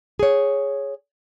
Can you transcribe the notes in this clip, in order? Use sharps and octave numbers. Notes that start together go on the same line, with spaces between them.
G#4 C#5